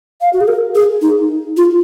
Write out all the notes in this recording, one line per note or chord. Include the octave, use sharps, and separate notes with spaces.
F5
F#4
G#4
A#4
G#4
D#4
F4